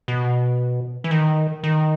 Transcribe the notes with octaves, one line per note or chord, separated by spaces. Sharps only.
B2
E3
D#3
D#3